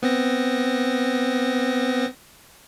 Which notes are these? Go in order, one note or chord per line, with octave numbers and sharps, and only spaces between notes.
B3 C4 A#6